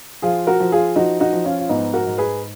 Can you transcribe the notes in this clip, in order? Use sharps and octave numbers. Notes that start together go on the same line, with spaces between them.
F3 F4 G#4
F#4 A#4
F3
F4 G#4
F3 D#4 F#4
D#4 F#4
F3
C#4 F4
F4
G#2 B3 D#4
F#4 A#4
G#2
G#4 B4